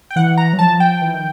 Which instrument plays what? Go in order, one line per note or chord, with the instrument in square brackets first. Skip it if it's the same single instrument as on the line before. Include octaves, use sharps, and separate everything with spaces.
[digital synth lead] G5
[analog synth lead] E3 [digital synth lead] F#5
[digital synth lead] A#5
[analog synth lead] F#3
[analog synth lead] F3 [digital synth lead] A5
[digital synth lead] G5
[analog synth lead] E3
D#3